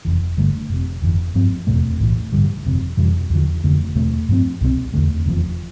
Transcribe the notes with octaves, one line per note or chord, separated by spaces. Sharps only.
F1 F2 E3
G1 G2 D3 A3
F1 F2 C3
G1 F2 E3
G2 F3 C4
F1 E2 B2 A3
B1 A2 E3
A1 G2 D3 G3
G1 F2 C3
F2 C3 E3 G3
E2 D3 F3
F1 F2 D3 A3
E2 B2 A3
G2 F3 C4
C2 B2 G3 C4
E2 D3 A3
F1 E2 C3 F3